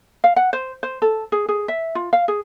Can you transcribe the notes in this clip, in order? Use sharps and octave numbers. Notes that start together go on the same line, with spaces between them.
F5
F#5
C5
C5
A4
G#4
G#4
E5
F4
F5
G#4